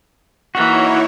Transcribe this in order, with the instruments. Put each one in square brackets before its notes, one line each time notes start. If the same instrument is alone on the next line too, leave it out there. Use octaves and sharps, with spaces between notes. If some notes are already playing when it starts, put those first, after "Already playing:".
[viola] E3 A#3 [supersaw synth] D#4 E4 C#5 [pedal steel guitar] F#4